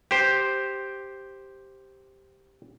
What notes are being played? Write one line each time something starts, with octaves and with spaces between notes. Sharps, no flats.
G4 C5